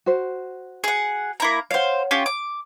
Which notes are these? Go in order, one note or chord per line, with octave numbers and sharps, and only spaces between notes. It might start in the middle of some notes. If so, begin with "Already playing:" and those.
F#4 C5
G#4 F#5
A#3 E4 A#5
C5 C#5 F5 F#5
C#4 F4 G4
D6